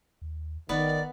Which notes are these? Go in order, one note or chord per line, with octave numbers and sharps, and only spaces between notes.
D#2
F1 D#3 B3 D5